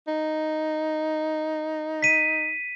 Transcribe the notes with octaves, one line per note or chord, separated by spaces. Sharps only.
D#4
B6 D#7